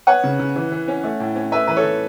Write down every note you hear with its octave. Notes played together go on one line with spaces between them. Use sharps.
B3 C#5 F#5
C#3
C#3
E3
E3
C#4
A3
A2
C#4
A3 B4 E5
E3 B4
A4 C#5
E3